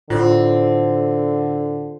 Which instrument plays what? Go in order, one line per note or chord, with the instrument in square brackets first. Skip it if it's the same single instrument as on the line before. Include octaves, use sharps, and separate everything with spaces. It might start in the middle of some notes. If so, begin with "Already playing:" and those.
[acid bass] A2 [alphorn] D3 [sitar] C4 [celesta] F4